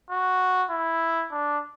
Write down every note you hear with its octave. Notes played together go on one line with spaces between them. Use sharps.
F#4
E4
D4